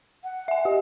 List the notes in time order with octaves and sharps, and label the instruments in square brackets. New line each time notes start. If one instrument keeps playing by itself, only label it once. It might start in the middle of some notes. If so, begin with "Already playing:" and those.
[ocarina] F#5
[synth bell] E5 G#5
[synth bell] G4 [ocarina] D#5